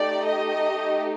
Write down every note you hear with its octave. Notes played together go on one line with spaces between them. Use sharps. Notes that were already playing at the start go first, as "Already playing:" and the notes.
Already playing: A3 D#4 G4 D5
D#5